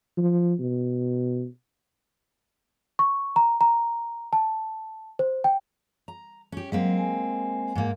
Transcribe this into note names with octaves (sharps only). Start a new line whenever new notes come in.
F3
B2
C#6
A#5
A#5
A5
C5
G5
A#5
C#4 G4
F#3 G#3 A#3 C4
G#5
G#2 A#3